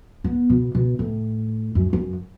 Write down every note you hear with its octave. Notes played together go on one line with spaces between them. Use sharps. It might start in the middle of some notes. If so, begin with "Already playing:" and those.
B3
B2
B2
A2
F#2
F#2